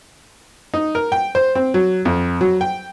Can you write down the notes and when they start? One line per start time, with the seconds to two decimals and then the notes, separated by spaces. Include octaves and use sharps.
0.74 D#4
0.95 A#4
1.12 G5
1.35 C5
1.55 C4
1.74 F#3
2.05 F2
2.41 F#3
2.61 G5